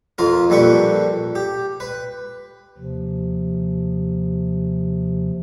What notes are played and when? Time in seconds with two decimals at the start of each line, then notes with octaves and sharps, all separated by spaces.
0.18 F2 F4 A#4
0.50 A#1 G3 A4 B4 C#6
1.35 G4
1.80 B4
2.78 D#2 C3 F3